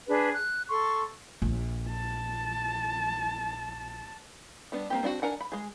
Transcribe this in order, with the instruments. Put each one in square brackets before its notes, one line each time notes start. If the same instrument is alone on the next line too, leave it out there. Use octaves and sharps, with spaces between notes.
[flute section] D4 G#4 B4
F#6
A4 C6 C#6
[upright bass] A#1
[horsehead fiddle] A5
[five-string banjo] G3 B3 D4
A#3 C4 G4
C4 D4 F4 F#4
D4 A#4 F#5 G#5
B5
G#3 G#4